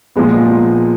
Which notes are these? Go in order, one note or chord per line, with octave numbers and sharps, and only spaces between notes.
A#2 F3 G#3 B3